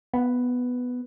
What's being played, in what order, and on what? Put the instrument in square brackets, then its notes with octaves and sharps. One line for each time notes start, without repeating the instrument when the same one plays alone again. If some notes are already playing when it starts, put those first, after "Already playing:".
[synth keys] B3